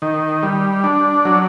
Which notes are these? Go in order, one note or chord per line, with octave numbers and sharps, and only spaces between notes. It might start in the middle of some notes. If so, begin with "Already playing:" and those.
D#3
G3
D4
F#3